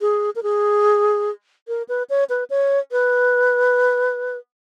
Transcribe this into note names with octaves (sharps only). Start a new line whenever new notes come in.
G#4
A#4
G#4
A#4
B4
C#5
B4
C#5
B4